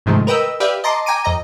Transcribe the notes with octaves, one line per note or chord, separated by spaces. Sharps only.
G#2 C3 D#3 F3 G#3 A3
A#4 B4 D#5 G5 E6
G4 B4 D5 E5 F5 G5
D#5 A5 A#5 C6 D6
G5 G#5 A#5 D6 D#7
F2 D#5 A#5